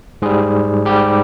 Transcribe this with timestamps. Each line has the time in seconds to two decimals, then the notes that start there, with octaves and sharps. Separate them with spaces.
0.22 G#2 G3 G#4
0.85 G#2 G3 G4